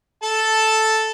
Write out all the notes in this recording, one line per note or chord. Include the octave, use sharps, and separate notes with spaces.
A4 A5